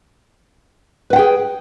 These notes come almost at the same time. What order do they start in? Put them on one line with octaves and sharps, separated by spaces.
B4 F#5 G5 G#4